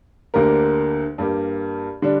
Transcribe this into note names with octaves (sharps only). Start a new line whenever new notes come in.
D2 D3 A#3 G4 A#4
G2 G3 A#3 G4
D3 G3 D4